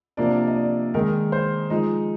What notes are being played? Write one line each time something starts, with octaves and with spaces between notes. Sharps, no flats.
C3 F3 A#3 D4 D5
D#5
D5
D#3 G#3 D#4 A#4
C5
F3 G#3 D#4 D#5